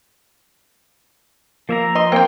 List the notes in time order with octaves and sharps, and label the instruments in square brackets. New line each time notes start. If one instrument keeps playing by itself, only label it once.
[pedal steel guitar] F3 E5 A#5 [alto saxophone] A#3
[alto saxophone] D#5 [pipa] C6
[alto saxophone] A#3 [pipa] C4 G5